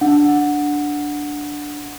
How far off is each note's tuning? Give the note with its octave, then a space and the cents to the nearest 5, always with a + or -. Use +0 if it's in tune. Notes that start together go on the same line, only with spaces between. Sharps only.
D4 +0 F#5 -10